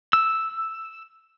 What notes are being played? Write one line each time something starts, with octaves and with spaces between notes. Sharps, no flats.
E6